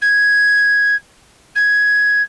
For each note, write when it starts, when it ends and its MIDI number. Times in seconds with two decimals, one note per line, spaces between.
0.01 0.94 92
1.55 2.22 92